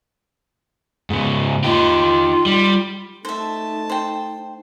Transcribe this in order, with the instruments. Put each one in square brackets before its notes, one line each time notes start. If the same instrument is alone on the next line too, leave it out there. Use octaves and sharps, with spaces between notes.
[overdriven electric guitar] G#2 C#3
[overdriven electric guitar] D#4 G4 [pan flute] F4
[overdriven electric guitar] G3
[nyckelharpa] A3 A5 [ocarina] D#4 [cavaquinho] C5 E5
[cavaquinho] C5 G5